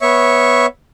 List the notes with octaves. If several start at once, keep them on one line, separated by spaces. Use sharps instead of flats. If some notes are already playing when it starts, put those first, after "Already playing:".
B3 C#5 E5 C#6